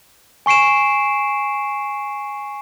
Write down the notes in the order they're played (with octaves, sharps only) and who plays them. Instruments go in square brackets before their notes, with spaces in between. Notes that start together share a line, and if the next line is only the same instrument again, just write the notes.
[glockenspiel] G#5 C#6 C7 D7 E7